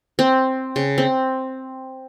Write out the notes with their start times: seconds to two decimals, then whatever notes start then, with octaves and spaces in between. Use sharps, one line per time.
0.19 C4
0.76 C#3
0.98 C4